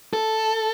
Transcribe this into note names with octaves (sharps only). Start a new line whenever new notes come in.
A4